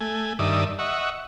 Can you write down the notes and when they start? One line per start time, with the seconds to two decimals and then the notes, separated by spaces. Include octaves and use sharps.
0.01 A3 G#5
0.39 G2 D#3 D5 E5 D#6
0.79 D#5 E5 F#5 C#6